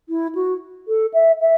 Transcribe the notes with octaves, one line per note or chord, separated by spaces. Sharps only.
E4
F#4
A4
E5
E5